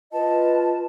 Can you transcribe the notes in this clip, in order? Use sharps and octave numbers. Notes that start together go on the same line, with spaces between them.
F4 B4 D#5 A5